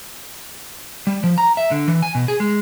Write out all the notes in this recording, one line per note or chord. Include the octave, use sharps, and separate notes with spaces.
G3
F3
A#5
E5
D3
E3
G#5
B2
G#4
G#3